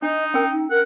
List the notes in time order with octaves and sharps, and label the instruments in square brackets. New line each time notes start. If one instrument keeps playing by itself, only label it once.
[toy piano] D4 [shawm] D#4 [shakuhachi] D#5
[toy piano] C#4 G5 E6 [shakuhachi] A#4
[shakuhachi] D#4
[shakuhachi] A#4 [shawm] F#5